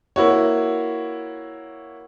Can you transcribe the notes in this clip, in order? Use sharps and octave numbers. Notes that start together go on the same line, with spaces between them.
A#3 E4 F#4 C#5